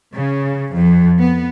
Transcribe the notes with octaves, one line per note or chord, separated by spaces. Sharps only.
C#3
F2
B3